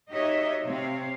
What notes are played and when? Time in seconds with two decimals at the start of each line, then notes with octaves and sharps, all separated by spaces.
0.12 D#4 F#4 G4 C#5 D#5 E5
0.63 C3 C4 C#5 F5